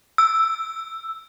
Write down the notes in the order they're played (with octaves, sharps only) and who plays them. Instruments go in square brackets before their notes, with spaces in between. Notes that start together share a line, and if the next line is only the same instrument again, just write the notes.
[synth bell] E6